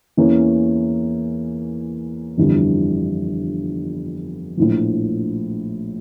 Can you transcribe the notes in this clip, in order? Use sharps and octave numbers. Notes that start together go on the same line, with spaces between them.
E2 E3 A#3 C#4
G1 F2 E3 G3 D4
A#1 A2 F3